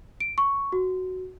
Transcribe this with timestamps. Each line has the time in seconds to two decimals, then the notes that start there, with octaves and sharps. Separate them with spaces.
0.20 D7
0.38 C#6
0.72 F#4